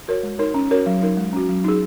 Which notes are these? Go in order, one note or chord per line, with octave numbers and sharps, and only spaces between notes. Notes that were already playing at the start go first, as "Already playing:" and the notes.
F#4 A#4 C#5
G#3
D#4 A#4 C#5
C#4
F#4 A#4 C#5
F#3
D#4 A#4
G#3
C#4 F#4
F#3
D#4 G#4